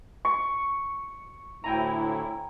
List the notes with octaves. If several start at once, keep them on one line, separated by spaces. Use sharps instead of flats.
C#6
D2 A2 E4 G5 G#5 A#5